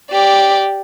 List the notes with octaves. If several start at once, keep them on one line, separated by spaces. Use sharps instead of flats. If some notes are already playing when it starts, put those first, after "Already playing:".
G4 D5